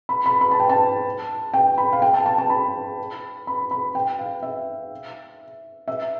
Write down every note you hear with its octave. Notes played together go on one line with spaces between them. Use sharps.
B5
B5
B5
A5
G5
A5
G5
B5
F5
G5
A5
A5
A5
B5
B5
B5
G5
F5
E5
E5